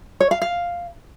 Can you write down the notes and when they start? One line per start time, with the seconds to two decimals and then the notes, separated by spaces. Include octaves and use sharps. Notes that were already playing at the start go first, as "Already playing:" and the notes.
0.20 C#5
0.31 F5
0.42 F5